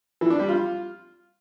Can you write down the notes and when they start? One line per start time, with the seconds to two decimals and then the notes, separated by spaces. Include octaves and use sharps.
0.21 E3
0.30 D4
0.39 G3
0.49 F4